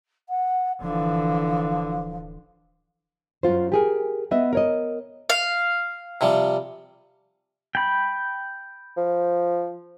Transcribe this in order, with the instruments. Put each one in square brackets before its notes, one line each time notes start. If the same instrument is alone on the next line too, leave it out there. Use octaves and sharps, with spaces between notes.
[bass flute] F#5
[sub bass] D1 [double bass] D3 E3 [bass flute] F3
[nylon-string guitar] F#2 B2 F4 C5
G4 G#4 A#4
B3 D#5 E5
A#4 C#5 D#5
[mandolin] F5
[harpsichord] C3 F3 G3
[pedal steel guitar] G5 B5
[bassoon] F3